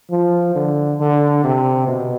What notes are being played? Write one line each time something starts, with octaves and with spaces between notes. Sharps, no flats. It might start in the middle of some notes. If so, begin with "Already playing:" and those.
F3
D3
D3
C3
B2